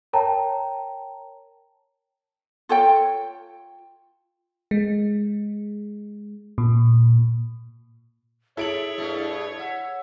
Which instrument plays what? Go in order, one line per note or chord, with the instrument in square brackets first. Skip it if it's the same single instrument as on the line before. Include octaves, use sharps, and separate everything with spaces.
[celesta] A#4 C#5 G5 A5 A#5
[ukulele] F4 A4 C#5 G5
[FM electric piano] G#3
A#2
[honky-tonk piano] E4 D7 F#7 [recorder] G#4 [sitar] A4 [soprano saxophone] C#5
[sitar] G2 B2 A3
[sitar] E5 [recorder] F#5